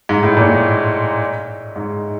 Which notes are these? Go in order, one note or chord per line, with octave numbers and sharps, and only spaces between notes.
G#2
A2
A#2
A2
G#2